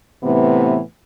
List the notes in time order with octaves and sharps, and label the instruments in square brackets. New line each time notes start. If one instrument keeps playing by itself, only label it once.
[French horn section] A2 C3 E3 B3